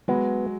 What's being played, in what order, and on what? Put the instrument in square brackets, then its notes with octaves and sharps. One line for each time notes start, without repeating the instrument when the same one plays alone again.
[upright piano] F#3 G#3 [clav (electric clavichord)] B3